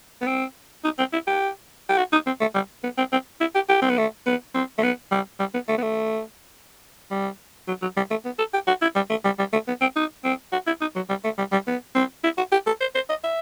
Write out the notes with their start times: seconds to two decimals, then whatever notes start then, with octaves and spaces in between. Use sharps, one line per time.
0.21 B3
0.27 C4
0.84 D#4
0.99 C4
1.13 E4
1.27 G4
1.89 G4
1.98 F#4
2.13 D#4
2.26 C4
2.41 A3
2.55 G3
2.84 B3
2.98 C4
3.12 C4
3.40 E4
3.55 G4
3.69 G4
3.82 C4
3.90 B3
3.97 A3
4.26 B3
4.54 C4
4.78 A3
4.83 B3
5.11 G3
5.40 G3
5.54 B3
5.68 A3
5.78 B3
5.82 A3
7.11 G3
7.68 F#3
7.82 F#3
7.96 G3
8.10 A3
8.25 B3
8.38 A4
8.53 G4
8.68 F#4
8.82 E4
8.95 G3
9.10 A3
9.25 G3
9.39 G3
9.53 A3
9.67 B3
9.81 C4
9.96 D#4
10.24 C4
10.53 F#4
10.67 E4
10.81 D#4
10.95 F#3
11.09 G3
11.24 A3
11.38 G3
11.52 G3
11.67 B3
11.95 C4
12.24 E4
12.37 F#4
12.52 G4
12.66 A4
12.81 C5
12.95 C5
13.09 D#5
13.24 E5